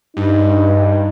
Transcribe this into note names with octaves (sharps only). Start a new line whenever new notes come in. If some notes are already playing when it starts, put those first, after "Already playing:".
G2 D#4